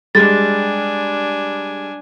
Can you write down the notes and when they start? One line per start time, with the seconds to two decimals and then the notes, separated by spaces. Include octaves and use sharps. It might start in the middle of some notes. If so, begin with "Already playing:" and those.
0.15 G3 G#3 D4 G#5 A6